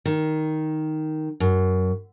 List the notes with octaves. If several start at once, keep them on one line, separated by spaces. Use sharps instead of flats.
D#3
F#2